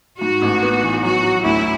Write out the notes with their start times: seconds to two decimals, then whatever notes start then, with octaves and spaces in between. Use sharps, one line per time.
0.21 G#2 F#4
0.42 A1
0.63 B3
0.83 E3
1.03 F#3 F#4
1.24 F#3
1.44 D2 E4